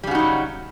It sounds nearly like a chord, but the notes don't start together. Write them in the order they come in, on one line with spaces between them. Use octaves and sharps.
G3 C#3 F#4 D#4 F#3